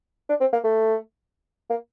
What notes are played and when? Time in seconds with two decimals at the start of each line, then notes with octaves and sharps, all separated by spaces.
0.29 D4
0.41 C4
0.53 A#3
0.64 A3
1.70 A#3